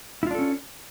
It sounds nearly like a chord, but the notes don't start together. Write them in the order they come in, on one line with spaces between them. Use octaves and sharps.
E4 F4 D4 A4 C#4